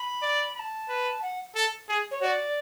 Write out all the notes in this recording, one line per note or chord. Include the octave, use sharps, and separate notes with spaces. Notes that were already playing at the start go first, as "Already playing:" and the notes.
Already playing: B5
D5
B5
A5
B4
F#5
A4
G#4
C#5
F#4 D5